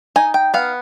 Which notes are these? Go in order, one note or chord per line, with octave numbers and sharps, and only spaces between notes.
D#4 G#5
G5
B3 F5